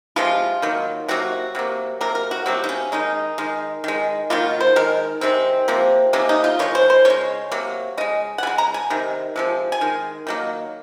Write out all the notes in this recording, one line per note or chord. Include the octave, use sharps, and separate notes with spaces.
C3 F3 G#3 F4
D#3 F#3 A#3
C3 F#3 A#3 F#4
C3 F#3 A#3
C3 F#3 A#3 A#4
A#4
F#4
C3 F#3 A#3 C4
D#4
C#4
D#3 G#3 D#4
D#3 G#3
D#3 G#3
D#3 F#3 A#3 F4
C5
D#3 G#3 A#4
C3 D#3 G#3 C4
C3 F3 A#3
C3 D#3 A#3 C#4
D#4
F4
D#3 G#3 C#5
C5
C5
C#3 G#3 C#5
C3 F#3 A#3
C#3 G#3 D#5
F#5
C#3 G#3 G#5
A#5
G#5
C3 D#3
C3 F3 G#3
G#5
D#3 G#3
D#3 F#3 A#3